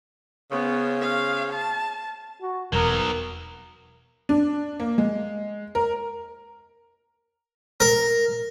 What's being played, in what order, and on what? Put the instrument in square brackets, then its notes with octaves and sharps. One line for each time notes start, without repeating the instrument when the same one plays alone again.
[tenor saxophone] C#3 [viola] B3 [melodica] C#4 C5 C#5
[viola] F5
A5
[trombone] F#4
[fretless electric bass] E1 [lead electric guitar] F#3 B3 [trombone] A#4
[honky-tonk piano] D4
A#3
G#3
A#4
[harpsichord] A#4